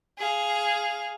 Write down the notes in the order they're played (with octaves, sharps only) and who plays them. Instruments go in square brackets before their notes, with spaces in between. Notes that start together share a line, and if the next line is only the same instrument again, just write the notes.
[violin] G#4 F5